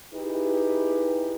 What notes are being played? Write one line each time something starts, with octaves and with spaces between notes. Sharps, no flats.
D#4 E4 G4 G#4 B4